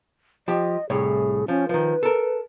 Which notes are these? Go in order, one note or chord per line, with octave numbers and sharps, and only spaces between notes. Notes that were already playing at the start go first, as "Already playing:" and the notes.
F3 G4 D#5
C2 A2 G#4 C#5
F3 C#4
D#3 F3 B4
A4 A#4